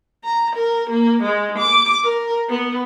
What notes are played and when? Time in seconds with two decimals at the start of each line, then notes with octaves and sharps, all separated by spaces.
0.24 A#5
0.56 A#4
0.90 A#3
1.23 G#3
1.58 D6
2.03 A#4
2.49 B3